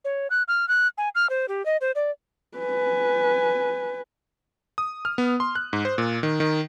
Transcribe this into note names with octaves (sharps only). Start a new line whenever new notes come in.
C#5
F#6
F6
F#6
G#5
F6
C5
G4
D#5
C5
D5
B4 G#5
D#6
F6
B3
C6
F#6
G#2
C5
A#2
D#3
D#3